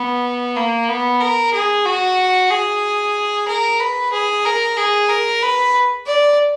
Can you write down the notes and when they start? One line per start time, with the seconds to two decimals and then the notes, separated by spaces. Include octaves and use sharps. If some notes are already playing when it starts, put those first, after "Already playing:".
Already playing: B3
0.56 A#3
0.89 B3
1.21 A#4
1.54 G#4
1.86 F#4
2.50 G#4
3.48 A#4
3.80 B4
4.12 G#4
4.45 A#4
4.77 G#4
5.09 A#4
5.42 B4
6.06 D5